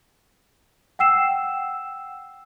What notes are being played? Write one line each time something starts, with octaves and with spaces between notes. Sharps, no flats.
F#5 G5 E6 C7 E7